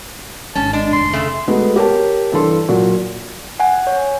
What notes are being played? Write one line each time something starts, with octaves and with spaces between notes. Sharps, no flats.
G#1 C#4 A5
G#3 D4
F1 D#3 C6
C#3 A3
G#3 A3 B3 F#4
G4 A#4 C#5 A5
G2 E3 A4 C6
A#2 F#3 F#4
F#5 G#5
C#5